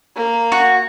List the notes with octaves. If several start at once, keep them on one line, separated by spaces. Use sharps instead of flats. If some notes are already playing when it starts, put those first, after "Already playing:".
A#3
F#4